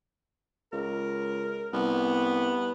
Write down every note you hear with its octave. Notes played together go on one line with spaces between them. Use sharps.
C#2 A#4
C2 B3